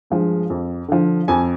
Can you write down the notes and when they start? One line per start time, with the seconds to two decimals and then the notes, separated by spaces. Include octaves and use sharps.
0.10 G2 F3 G#3
0.50 F2
0.88 D3 F3
1.28 F2 G#5